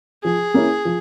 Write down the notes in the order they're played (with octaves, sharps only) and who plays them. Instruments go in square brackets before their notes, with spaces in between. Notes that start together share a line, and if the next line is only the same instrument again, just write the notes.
[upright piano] F3 [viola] G#4
[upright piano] A#3 C#4 E4
F3